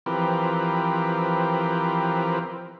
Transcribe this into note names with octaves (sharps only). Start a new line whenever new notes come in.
E3 F3 C4 G4 A#4 B4